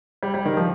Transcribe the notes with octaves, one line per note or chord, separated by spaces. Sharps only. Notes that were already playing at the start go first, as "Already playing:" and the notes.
G3
G3
D#3
F3